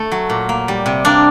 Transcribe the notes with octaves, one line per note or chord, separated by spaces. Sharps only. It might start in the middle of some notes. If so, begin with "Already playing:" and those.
Already playing: A3 A4
F#3
A#2
A#3
G3
C3
A#3 D4